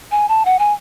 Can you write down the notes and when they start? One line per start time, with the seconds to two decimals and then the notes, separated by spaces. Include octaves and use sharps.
0.11 G#5
0.29 A5
0.45 F#5
0.59 G#5